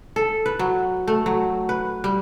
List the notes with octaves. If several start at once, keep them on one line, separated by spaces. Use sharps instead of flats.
A4
B4
F#3
A3
F#3
B4
G3